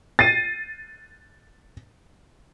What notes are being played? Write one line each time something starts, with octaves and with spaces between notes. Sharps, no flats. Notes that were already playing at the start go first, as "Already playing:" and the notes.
A6 C7 D#7